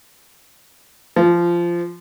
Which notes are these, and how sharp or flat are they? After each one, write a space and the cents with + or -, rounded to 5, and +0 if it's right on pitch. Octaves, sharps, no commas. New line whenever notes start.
F3 -15